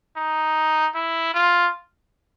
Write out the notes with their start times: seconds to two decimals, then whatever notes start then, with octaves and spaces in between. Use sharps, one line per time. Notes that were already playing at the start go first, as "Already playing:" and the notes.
0.17 D#4
0.95 E4
1.34 F4